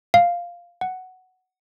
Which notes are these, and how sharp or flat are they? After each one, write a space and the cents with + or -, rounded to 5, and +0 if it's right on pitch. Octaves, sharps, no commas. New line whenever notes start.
F5 +0
F#5 +5